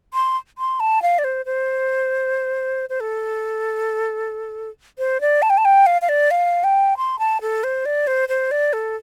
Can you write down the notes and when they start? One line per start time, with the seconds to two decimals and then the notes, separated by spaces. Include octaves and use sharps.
0.14 C6
0.58 C6
0.80 A5
1.02 F5
1.19 D5
1.24 C5
1.46 C5
2.89 C5
3.00 A4
4.98 C5
5.21 D5
5.42 A5
5.50 G5
5.57 A5
5.65 G5
5.86 F5
6.02 F5
6.09 D5
6.31 F5
6.64 G5
6.97 C6
7.19 A5
7.41 A4
7.64 C5
7.86 D5
8.07 C5
8.29 C5
8.51 D5
8.73 A4